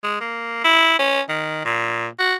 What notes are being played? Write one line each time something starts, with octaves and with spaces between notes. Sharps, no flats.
G#3
A#3
E4
C#4
D#3
A#2
F#4